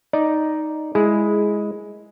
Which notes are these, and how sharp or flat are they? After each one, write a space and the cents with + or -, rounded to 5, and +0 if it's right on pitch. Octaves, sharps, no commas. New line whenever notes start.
D#4 +0 D5 +0
G#3 +0 E4 +0 G#4 +10